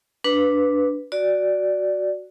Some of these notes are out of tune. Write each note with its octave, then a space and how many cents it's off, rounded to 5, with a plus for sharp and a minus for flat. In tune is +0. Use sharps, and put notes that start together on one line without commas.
D4 -5 B4 +0
F#4 +0 D5 +0